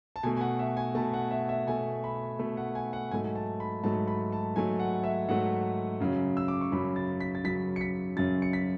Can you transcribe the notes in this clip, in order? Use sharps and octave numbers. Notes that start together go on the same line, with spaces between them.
A5
B2 A3 G#5
G#5
F#5
E5
G#5
B2 A3 A5
F#5
E5
E5
B2 A3 G#5
B5
B2 A3
F#5
G#5
F#5
G#2 F#3 A3 G#5
A5
B5
G#2 F#3 A3 A5
B5
A5
G#2 F#3 A3 G#5
F#5
E5
G#2 F#3 A3 F#5
F#2 C#3 F#3
E6
D6
C#6
F#2 C#3 F#3 B5
A6
B6
A6
F#2 C#3 F#3 B6
C#7
B6
F#2 C#3 F#3 A6
C#7
B6